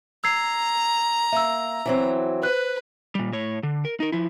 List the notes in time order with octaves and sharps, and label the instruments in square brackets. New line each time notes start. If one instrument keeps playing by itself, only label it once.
[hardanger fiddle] A#5 [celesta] E6 G#6 C7
[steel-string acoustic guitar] A#3 [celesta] E5 E6
[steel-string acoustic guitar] E3 F#3 C4
[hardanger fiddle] B4 [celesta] C5 F#6
[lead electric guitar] A#2 G3
A2 C#5
D3
A#4
D#4 A#4
F3 E4